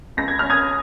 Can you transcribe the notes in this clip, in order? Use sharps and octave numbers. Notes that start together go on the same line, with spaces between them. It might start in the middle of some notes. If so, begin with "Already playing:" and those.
C#2 A#6
G#6
C#4 F6
D#6 G#6